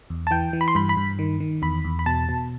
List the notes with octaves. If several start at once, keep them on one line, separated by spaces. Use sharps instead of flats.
E2
A5
E3 G5
E3
B5
C6
G2 B5
B5
G2
D#3
D#3
E2 B5
E2
B5
B2 A5
B2